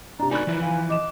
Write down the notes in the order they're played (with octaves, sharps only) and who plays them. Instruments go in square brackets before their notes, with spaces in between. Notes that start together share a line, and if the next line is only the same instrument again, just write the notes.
[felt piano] C3 D4 [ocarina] A#5
[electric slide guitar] D#4 F#4 A#4 [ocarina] D5 [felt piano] G#5 B5 F#6
[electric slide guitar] E3 F3 E4
[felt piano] F5 [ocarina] G#5
[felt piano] D#5 E7 [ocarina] D6